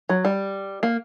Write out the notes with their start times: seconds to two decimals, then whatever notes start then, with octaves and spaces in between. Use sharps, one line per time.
0.09 F#3
0.25 G3
0.83 A#3